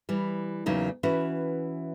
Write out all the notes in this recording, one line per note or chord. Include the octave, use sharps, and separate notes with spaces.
E3 G3
E2 C#3 F#3 A#3 D#4
E3 C#4 F#4 B4